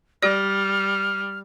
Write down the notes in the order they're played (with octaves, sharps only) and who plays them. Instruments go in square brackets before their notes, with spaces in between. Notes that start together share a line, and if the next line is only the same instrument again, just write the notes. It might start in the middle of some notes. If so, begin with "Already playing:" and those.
[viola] G3 [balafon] G4 D5 [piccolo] F6